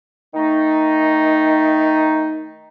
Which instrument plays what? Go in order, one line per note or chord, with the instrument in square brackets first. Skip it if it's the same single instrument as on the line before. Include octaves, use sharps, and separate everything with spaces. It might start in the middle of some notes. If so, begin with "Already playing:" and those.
[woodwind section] D#3 A3 D#4